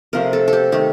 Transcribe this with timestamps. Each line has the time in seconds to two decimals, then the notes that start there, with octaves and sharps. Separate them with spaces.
0.13 C3 F3 A3 A#4
0.33 A4
0.48 A4
0.53 G4
0.72 D#3 A3 G4